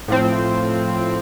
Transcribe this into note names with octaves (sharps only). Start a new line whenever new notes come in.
A2 F3 C4